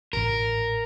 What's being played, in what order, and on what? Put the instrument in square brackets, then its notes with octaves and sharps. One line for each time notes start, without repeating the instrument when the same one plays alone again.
[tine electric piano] A1 A2 [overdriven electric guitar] A#4